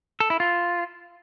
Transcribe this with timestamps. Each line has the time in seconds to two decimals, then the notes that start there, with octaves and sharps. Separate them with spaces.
0.20 A4
0.30 E4
0.40 F4